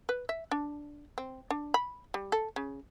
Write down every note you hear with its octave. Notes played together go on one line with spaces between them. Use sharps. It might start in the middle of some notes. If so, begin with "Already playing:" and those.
B4
E5
D4
C4
D4
B5
G3
A4
C#3